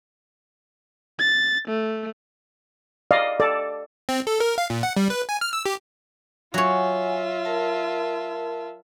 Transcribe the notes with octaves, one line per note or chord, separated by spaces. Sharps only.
A6
A3
D5 D#5 F5
A4 D5
C4
A4
A#4
F5
A#2
F#5
G3
B4
G#5
F6
E6
G4
F#3 F4 C#5 E5 F#5 G#5
A#4 A5